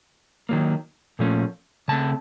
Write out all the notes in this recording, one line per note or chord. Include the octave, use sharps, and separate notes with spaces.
D#3 F#3 A#3
A#2 F3 A3 C#4
C#3 A3 C4 A5